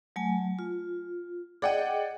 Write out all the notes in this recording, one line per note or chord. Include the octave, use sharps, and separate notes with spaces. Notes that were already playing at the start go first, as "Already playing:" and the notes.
F#3 A3 G#5
F4
G#4 D5 D#5 F#5 G5